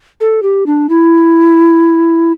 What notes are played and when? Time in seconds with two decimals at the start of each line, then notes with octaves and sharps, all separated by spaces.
0.20 A4
0.43 G4
0.66 D4
0.89 E4